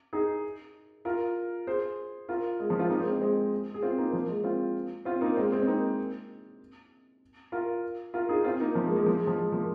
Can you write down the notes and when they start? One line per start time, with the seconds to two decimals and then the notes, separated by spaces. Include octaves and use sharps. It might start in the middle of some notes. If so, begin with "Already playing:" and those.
0.13 D#4 G#4
1.05 F4 A#4
1.67 G#4 C5
2.29 F4 A#4
2.60 G#3
2.70 F3
2.79 C4 F4
2.90 A#3 D#4
3.00 G#3 C4
3.21 G#3 C4
3.74 G#4
3.82 C4 F4
3.98 A#3 D#4
4.13 F3 A#3
4.29 G#3
4.44 C4 F4
5.05 C4 F4
5.21 A#3 D#4
5.37 G#3 C4
5.52 G#3 C4
5.62 C4
5.67 A#3 D#4
7.52 F4 A#4
8.14 F4 A#4
8.29 D#4 G#4
8.44 C4 F4
8.60 A#3 D#4
8.75 F3
8.86 G#3
8.91 A#3
8.96 G#3
9.06 F3
9.17 G#3
9.27 F3
9.37 G#3
9.52 F3 A#3